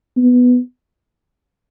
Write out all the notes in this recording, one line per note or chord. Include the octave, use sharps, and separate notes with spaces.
B3